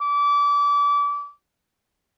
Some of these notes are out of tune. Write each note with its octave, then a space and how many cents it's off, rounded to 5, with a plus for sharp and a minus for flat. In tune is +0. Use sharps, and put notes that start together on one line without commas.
D6 -30